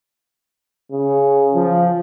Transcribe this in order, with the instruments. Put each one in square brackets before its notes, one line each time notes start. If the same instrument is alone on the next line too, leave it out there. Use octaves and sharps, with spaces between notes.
[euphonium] C#3
F3